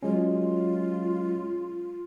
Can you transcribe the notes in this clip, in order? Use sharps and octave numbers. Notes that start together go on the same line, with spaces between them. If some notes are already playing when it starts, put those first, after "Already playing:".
F#3 G#3 C#4 F4